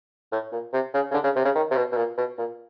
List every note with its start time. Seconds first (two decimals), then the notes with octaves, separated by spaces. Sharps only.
0.32 A2
0.52 A#2
0.73 C3
0.94 C#3
1.11 C#3
1.14 D3
1.24 C#3
1.36 C3
1.45 C#3
1.55 D#3
1.71 C3
1.77 B2
1.92 B2
1.97 A#2
2.18 B2
2.38 A#2